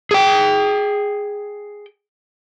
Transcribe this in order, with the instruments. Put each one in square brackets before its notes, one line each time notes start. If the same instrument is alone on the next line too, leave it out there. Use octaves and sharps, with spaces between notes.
[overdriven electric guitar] G#4 G5